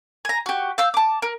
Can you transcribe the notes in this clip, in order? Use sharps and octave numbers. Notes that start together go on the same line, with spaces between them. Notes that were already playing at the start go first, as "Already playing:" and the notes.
G#5 A#5
F#4 G4
F5 E6 G6
A5 D6
A#4